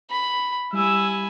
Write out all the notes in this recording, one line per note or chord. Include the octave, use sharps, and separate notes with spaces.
B5
G3 E4 G#5 E6